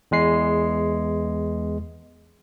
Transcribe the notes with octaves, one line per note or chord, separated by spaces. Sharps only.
E2 G#3 C7